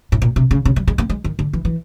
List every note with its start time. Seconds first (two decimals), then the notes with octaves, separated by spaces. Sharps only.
0.12 A2
0.22 A#2
0.36 C3
0.51 C#3
0.65 C#3
0.76 G3
0.88 G#3
0.98 A#3
1.10 G#3
1.24 D#3
1.39 D3
1.53 E3
1.65 E3